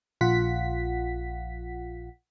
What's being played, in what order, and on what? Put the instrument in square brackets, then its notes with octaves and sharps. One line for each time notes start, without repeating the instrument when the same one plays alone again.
[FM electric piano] A#1 F4 F#5 B6